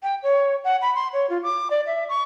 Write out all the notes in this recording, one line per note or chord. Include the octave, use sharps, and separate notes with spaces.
G5
C#5
F#5
B5
C6
C#5
F4
D6
D5
E5
C#6